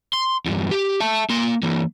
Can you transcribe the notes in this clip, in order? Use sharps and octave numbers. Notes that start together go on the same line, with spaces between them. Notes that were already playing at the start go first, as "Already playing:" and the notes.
C6
E2 G2
G4
E5 A5
A#3 C6
E3 A#3